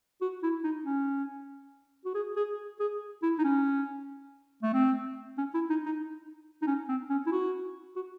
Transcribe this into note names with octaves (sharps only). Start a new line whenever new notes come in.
F#4
E4
D#4
C#4
F#4
G#4
G#4
G#4
E4
D#4
C#4
A3
C4
C#4
E4
D#4
D#4
D#4
C#4
C4
C#4
E4
F#4
F#4